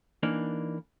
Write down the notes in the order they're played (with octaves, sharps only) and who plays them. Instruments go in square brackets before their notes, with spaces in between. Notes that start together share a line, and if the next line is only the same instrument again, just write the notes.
[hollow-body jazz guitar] E3 A#3 D4 D#4